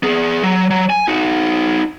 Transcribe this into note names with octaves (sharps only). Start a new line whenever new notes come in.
B3 G#4
F#3
F#3
G#5
D#4 F#4